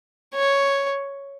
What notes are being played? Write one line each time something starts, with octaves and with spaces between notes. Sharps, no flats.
C#5